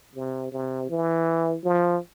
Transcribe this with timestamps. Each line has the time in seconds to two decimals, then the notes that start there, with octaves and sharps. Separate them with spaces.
0.15 C3
0.52 C3
0.90 E3
1.64 F3